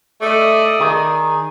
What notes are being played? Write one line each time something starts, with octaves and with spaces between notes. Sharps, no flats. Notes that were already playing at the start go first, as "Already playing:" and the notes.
A3 D5 D#5
D#3 G#4